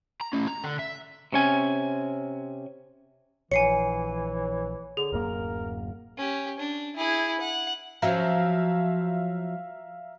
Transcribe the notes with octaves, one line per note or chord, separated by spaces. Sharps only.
A#5
A3 C#4
A#5
D3
E5
C3 C#4 G#5
A#1 E3 C#5 G#5 C7 C#7
D3 G#4
D1 F#2 A#3 A#4
C#4 G4
D4
E4 G#4
F#5
F3 F#3 C#4 E5 F5 A#5